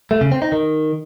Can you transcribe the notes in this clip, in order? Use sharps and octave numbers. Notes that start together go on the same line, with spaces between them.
A3
C#3
C4
D#4
D#3